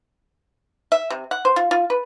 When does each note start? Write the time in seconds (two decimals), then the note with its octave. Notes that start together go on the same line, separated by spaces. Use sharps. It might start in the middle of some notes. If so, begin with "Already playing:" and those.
0.92 E5
1.10 C3
1.31 F#5
1.45 C5
1.56 F4
1.71 F4
1.90 B4